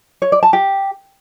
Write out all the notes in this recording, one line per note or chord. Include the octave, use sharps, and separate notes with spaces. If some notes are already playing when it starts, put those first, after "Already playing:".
C#5
D5
A5
G4